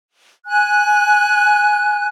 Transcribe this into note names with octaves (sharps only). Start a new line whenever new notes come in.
G#5 F#6